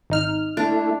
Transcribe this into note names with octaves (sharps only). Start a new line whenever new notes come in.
G#1 D#4 F6
A3 D4 E4